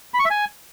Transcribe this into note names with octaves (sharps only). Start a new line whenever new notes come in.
B5
C#6
E5
G#5